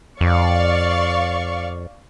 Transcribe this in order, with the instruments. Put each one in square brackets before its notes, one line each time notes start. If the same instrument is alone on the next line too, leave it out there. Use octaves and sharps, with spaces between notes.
[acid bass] F2 [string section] D5 F5 C#6